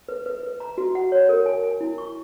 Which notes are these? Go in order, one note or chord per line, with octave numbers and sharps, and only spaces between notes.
B4
B4
B4
A#5
F#4
F#5
C#5
A#4
G#5
G#5
E4
C#6